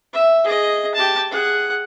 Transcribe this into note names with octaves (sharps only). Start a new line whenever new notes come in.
E5
G#4 D#5
G4 A5
G#4 F#5